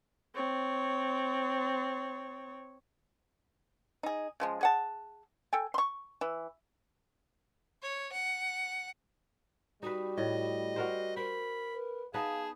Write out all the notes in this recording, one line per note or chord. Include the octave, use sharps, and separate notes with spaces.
C4 C#5
D#4 G#4
C#3 F3 G#3
G#4 F#5 A5
A4 G5 G#5
C6 C#6
E3
C#5
F#5
G3 D#4 F#4 B4
A2 D#5
F#4 A#4 C5
A#4 C5 B5
B4
B3 D#4 G#4 B4 F5 A5